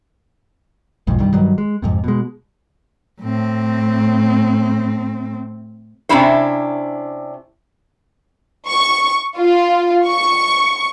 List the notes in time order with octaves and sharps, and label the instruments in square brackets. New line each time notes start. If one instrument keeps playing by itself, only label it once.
[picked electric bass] B1 F2 G#2
C2 G2 D#3 G3
G2 D#3 F#3 G3
G#3
F2 G#2 C3
B2 G#3
[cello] A2 C4
[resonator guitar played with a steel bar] C3 G#3 C#4 D4 E4 C5
[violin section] C#6
F4
C#6